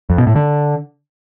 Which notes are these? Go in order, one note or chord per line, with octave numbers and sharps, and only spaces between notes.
F2
B2
A2
D3